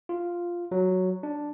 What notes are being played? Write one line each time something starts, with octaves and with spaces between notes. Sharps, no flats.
F4
F#3
D4